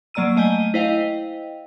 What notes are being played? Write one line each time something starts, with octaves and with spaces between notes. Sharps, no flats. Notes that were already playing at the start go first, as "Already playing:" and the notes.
F#3 A#3 D5 A#5 E6 D#7
A3 D#5 G#5 G6 G7
E4 C5 D#5 F5 G5